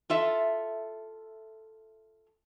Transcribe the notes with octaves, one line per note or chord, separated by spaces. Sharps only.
F4 A4 E5